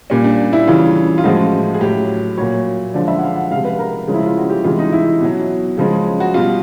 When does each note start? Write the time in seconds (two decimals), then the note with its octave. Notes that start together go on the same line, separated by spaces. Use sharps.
0.10 A#2 G3 C#4
0.24 D4
0.53 E4
0.67 C#3 E3 G3 F4
1.18 F4
1.24 A2 F3 G#3 F#4
1.74 G#4
1.81 A2 F#3 G4
2.37 A#2 F#3 C#5
2.94 D3 F3 G#3 D5
3.08 E5
3.18 F#5
3.23 F5
3.36 F#5
3.51 C3 F3 G#3 F5
3.64 B4
3.79 A#4
4.07 C#3 F3 G#3
4.14 E4
4.26 F4
4.38 F#4
4.50 G4
4.64 C3 E3 G#3 F4
4.79 D#4
4.93 E4
5.21 B2 F#3
5.77 C#3 F3 G#3
6.20 F#4
6.34 B2 G3 F4